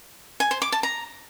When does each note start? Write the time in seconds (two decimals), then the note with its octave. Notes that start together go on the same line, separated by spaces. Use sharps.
0.40 G#5
0.51 C5
0.62 D6
0.72 A5
0.83 A#5